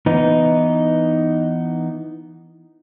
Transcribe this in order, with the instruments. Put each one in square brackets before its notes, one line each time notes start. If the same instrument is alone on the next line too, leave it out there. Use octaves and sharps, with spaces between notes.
[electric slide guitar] E3 B3 D#4